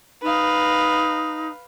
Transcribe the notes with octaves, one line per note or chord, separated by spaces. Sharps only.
D#4 B4 F5